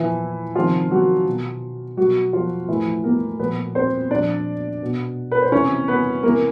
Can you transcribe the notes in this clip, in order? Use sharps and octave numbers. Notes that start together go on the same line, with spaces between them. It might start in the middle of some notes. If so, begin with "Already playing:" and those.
Already playing: A#2 E3 F3 E4
C3 D#3 F3 F4
F#3 F#4
B2
B2 F#3 F#4
F3 F4
A2 E3 F3 E4
A#3 A#4
A#2 F3 B3 B4
C4 C5
A#2 F3 D4 D5
B2
B4
C5
C3 E3 C#4 C#5
B3 B4
C3 E3 A#3 A#4